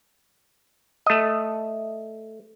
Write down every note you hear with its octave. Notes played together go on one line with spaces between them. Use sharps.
A3 D#5